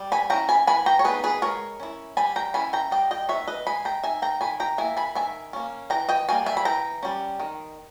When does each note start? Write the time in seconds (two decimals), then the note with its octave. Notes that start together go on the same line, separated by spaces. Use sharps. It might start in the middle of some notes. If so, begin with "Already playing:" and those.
Already playing: G3
0.12 G#5 B5
0.30 C#4 E4 G5 A#5
0.49 G#5 B5
0.67 E3 G#5 B5
0.86 G5 A#5
0.99 C#5
1.04 G3 B3 D#4 G#4 B4
1.24 G#4 B4
1.42 G#3 A#4 C#5
1.80 C#4 E4
2.17 G3 G#5 B5
2.36 G5 A#5
2.54 C#4 E4 G#5 B5
2.73 G5 A#5
2.91 G3 D#5 G5
3.11 D#5 G5
3.29 B3 D#4 C#5 E5
3.47 B4 D#5
3.66 G#3 G#5 B5
3.85 G5 A#5
4.03 D#4 E5 G#5
4.22 G5 A#5
4.41 D#3 G#5 B5
4.60 G5 A#5
4.78 A#3 E4 E5 G#5
4.97 G#5 B5
5.15 D#3 E5 G#5
5.53 A#3 C#4
5.90 E3 G5 A#5
6.09 D#5 G5
6.29 G3 A#3 G#5
6.46 E5 G#5
6.57 B5
6.65 E3 G5 A#5
7.03 G3 C#4
7.39 D#3